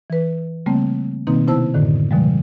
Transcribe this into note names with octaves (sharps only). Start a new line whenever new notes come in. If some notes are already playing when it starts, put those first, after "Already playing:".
E3 B4
C#3 G3 A3 A#3 C4
B2 D#3 A#3 C4 D#4
C3 B3 E4 C5 A5 E6
F#2 A2 D3 D#3
B2 D3 F3 G3 G#3